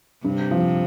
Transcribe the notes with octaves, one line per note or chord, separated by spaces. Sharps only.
G2 C3
F3